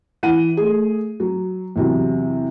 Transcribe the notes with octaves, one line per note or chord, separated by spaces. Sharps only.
E3 F#5 D#7
A3 G#4
F#3
E2 C3 F#3